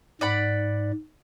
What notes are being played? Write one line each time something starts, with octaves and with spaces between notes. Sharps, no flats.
G#2 D5 F#5 B5